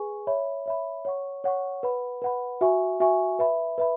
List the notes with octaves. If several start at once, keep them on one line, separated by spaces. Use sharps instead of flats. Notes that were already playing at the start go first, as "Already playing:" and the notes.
Already playing: G#4 B4 G#5 C#6
C#5 E5 B5
C#5 E5 B5
C#5 F#5 C#6
C#5 F#5 C#6
B4 F#5 B5
B4 F#5 B5
F#4 E5 G#5 C#6
F#4 E5 G#5 C#6
B4 E5 B5
B4 E5 B5